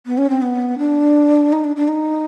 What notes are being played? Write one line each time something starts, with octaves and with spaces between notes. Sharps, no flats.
B3
C#4
C4
B3
D4
D#4
D4
D4
D#4